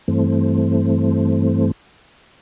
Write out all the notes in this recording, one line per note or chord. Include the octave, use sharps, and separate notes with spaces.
G2 E3 A3 C4